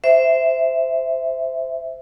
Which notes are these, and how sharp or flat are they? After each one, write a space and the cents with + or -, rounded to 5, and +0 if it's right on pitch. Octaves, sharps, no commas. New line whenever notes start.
C5 -15 E5 +0